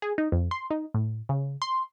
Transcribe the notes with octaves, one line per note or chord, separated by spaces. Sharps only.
G#4
D#4
F2
C6
D#4
A2
C#3
C6